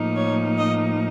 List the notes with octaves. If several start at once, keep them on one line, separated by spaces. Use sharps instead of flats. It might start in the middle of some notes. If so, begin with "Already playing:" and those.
Already playing: A2 F3 A#3 D#4
C#5
D#5